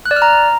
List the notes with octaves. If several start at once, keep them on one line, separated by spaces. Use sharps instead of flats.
F#6
D5
F6
A#5